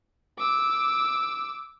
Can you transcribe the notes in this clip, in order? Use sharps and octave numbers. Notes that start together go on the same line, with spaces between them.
D6 E6